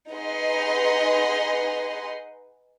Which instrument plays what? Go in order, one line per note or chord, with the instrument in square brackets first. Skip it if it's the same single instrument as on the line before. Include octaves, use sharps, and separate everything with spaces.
[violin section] D#4 G#4 B4 D#5 F#5 C6